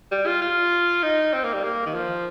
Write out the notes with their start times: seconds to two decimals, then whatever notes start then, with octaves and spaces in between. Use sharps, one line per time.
0.12 G3
0.27 F4
0.42 F4
1.03 D#4
1.33 C4
1.44 A#3
1.54 G3
1.64 A#3
1.86 D#3
1.94 F3